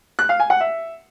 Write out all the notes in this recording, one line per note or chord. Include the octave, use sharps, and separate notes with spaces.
F#6
F5
G#5
F#5
E5